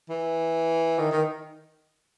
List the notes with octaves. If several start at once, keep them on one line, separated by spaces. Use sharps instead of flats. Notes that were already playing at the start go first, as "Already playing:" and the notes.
E3
D#3
D#3